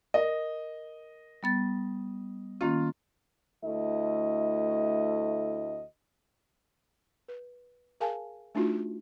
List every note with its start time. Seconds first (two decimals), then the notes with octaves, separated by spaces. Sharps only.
0.14 A#4 D#5
1.43 G3 B3 A6
2.61 D#3 A#3 C#4 F4
3.63 D2 A3 E4 D#5
7.28 B4
8.00 G#4 A#4 F5 G#5 A5
8.55 A3 D4 D#4 F4 F#4